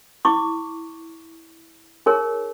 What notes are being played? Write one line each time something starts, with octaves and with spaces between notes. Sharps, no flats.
E4 C#6 D6
D#4 G#4 A#4 C#5